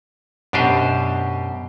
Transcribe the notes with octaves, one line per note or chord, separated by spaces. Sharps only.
F#2 B2 D4 G4 C5 D#5